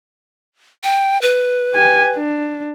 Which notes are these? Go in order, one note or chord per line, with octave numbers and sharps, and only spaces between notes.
G5
B4
G4 G#5
D4